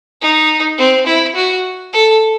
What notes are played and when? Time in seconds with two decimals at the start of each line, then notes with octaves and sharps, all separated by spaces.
0.21 D#4
0.79 C4
1.07 E4
1.35 F#4
1.93 A4